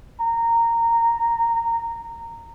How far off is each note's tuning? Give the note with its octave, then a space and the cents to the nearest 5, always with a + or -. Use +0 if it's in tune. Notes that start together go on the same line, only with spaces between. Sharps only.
A#5 -15